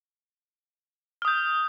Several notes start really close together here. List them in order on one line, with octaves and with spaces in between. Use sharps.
F6 D#6 G6